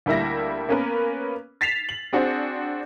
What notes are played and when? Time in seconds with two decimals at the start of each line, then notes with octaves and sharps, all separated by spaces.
0.06 D2 G3 A#3 E4 E5 A#6
0.69 A#3 B3 C#4 A#4 B4
1.61 A6 B6 C7 E7 F7
1.89 F#7
2.13 C4 D4 F#4 G#4 C5